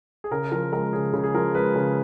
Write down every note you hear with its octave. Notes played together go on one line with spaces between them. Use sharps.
G#4
C#3 A#4
F3 A#4
G#3 A#4
C#3 G#4
C#3
G#4
F3 A#4
G#3 B4
C#3